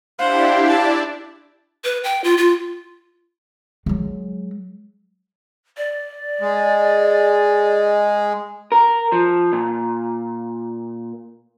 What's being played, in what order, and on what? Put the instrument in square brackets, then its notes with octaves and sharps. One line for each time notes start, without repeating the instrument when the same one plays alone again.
[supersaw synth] D4 E4 G4 [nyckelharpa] C5 F#5 [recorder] F5
[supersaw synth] D4 E4 D5 [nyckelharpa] A5
[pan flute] B4
G5
F4
F4
[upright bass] F#3 G#3
[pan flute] D5
[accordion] G#3
[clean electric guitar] A#4
F3
A#2